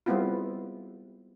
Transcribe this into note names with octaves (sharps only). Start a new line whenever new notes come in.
G3 G#3 B3 C4 E4 F4